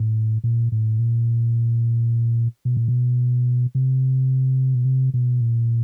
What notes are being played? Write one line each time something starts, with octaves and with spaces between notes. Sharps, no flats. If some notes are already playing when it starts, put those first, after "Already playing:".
Already playing: A2
A#2
A2
A#2
B2
A#2
B2
C3
B2
C3
B2
A#2